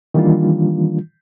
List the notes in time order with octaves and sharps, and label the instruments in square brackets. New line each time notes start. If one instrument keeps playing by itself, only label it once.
[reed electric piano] D#3 E3 G3 A#3 D4 F4